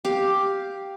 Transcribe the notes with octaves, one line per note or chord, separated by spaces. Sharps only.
G4 F5